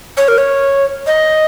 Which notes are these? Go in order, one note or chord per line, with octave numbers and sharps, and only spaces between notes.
C#5
A#4
C#5
D#5